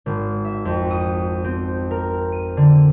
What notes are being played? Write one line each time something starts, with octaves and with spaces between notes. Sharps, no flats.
G#1
E5
F2
D#6
C4
A#4
D#7
D3